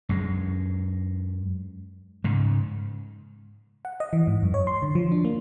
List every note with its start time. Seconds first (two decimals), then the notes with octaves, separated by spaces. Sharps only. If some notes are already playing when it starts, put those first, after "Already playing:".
0.09 F#2 G#3
2.24 G#2 C#3
3.85 F#5
4.00 D#5
4.13 E3
4.27 G#2
4.42 F#2
4.54 C#5
4.67 C6
4.82 D3
4.95 F3
5.12 D4
5.25 A#3